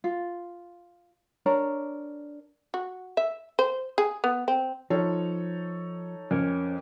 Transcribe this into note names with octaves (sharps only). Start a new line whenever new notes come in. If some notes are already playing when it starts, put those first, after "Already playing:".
F4
D4 A#4 C#5
F#4
E5
C5
G#4
B3
C4
F3 D#4 A4 C#5
F2 C#4 A#4 C#5